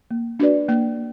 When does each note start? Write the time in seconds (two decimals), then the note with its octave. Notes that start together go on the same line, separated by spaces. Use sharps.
0.11 A#3
0.40 D4 F#4 B4 D5
0.69 A#3